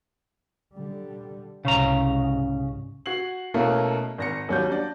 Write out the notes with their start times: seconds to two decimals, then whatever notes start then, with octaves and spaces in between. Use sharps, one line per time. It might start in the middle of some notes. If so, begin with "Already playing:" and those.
0.74 D3 G3
1.65 C2 G#2 C#3 C#4 A#5
3.06 F#4 G#6 C7 F#7
3.54 B2 A3 A#3 C#4 E4 A#4
4.18 G#1 A#6 C#7
4.49 D#2 F#3 G3 C#4 F#4 G6
4.70 D4 D5